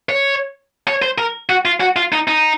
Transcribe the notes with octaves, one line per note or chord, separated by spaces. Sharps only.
C#5
C#5
C5
A#4
F#4
F4
F#4
F4
D#4
D#4